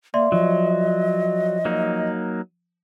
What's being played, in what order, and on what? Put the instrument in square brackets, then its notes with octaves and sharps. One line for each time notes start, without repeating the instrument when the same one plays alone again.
[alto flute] A#3 [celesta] D5 E5 C6
[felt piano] F3 [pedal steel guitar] F#3 [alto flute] D#5
[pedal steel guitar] F#3 A#3 D#4